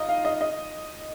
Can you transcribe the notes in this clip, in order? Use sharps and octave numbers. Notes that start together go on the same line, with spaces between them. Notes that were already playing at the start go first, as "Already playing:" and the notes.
Already playing: D#4 F4 D#5
F5
D#5
D#5